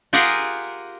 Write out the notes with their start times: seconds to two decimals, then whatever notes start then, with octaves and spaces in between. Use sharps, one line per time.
0.13 F4 G4 G#4 A#4 F#5